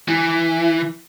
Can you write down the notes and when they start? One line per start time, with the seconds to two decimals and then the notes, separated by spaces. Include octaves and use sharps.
0.08 E3